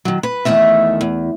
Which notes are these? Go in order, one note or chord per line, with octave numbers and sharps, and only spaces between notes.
D#3 F#3
B4
E2 B2 D#3 A3 E5
E2